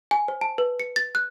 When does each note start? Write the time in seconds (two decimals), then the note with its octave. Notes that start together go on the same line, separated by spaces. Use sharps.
0.11 G#5
0.28 C5
0.41 A5
0.58 B4
0.80 C#7
0.96 A6
1.15 F#6